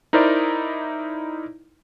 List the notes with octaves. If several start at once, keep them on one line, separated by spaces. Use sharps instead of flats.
D#4 E4 A#4 C5 D5